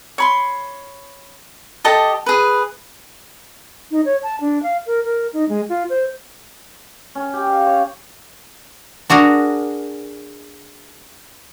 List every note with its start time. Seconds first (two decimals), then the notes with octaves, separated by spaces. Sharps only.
0.18 C#5 B5 C6
1.84 G4 A4 D#5 A5
2.26 G#4 B4
3.91 D#4
4.05 C#5
4.23 A5
4.41 D4
4.63 F5
4.86 A#4
5.05 A#4
5.33 D#4
5.49 G#3
5.69 F4
5.90 C5
7.15 C#4
7.33 G4
7.47 F5
7.67 C#5
9.10 D4 F#4 G#4 A#4